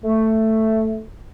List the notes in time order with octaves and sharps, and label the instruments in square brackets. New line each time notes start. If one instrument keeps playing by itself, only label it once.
[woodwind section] A3